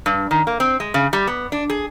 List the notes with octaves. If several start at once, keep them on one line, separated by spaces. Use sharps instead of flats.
G2
D#3
A#3
C4
G#3
C#3
G3
B3
D4
G#4